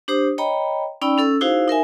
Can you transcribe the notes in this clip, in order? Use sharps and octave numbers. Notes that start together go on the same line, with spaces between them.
D4 G4 C5 D#6
C#5 D#5 G5 A#5 B5
C#4 D#4 D5 G5 B5 E6
C#4 A4 E6
D#4 E4 F#4 G#4 C5 F5
D#4 A#4 E5 G#5